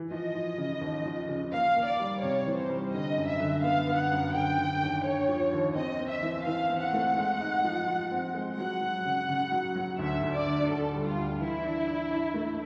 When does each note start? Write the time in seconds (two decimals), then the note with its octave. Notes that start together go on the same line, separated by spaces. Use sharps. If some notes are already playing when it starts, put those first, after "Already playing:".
Already playing: E3
0.11 F3 D#5
0.35 F3
0.58 C#3
0.81 D#2
1.05 F3
1.28 C#3
1.52 A#3 F5
1.76 A#3
1.88 D5
1.99 G3
2.22 C3 C#5
2.46 E3
2.58 C5
2.70 G3
2.93 D3 D#5
3.17 F#2
3.29 E5
3.40 D3
3.63 B3 F5
3.87 B3
3.99 F#5
4.11 F#2
4.34 D3 G5
4.58 D3
4.81 D#2
5.05 D3 C#5
5.28 F3
5.52 D#2
5.76 C4 D#5
5.99 C4
6.11 E5
6.23 E3
6.46 E3 F5
6.70 C4
6.82 F#5
6.93 A3
7.17 G#3
7.41 D#4
7.64 F3
7.88 F3
8.11 C4
8.34 G#3
8.58 F#3 F#5
8.81 F#3
9.05 C#3
9.29 C#3
9.52 F#3
9.75 F#3
9.99 D2 E5
10.23 D2
10.35 D5
10.46 D3
10.69 D2 A4
10.93 G3
11.05 F4
11.17 D2
11.40 E3 E4
11.63 D4
11.88 D4
12.11 D4
12.34 A3